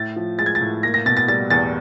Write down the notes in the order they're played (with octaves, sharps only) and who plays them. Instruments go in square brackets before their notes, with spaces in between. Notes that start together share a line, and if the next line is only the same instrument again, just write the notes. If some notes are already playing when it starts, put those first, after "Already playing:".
Already playing: [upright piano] A2 A6
F3
G#3 A6
G#6
A6
A2
A#3 A#6
A#6
B2 A6
A6
G3 A6
E2 A6